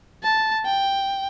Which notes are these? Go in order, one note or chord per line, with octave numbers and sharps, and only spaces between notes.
A5
G5